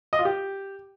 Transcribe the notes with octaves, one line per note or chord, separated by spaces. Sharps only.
D#5
F4
G4